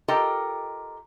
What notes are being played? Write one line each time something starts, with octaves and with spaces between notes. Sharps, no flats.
F4 G4 A4 A#4 D#5 G5